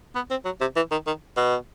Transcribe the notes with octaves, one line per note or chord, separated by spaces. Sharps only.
B3
C4
F#3
C3
E3
D#3
D#3
B2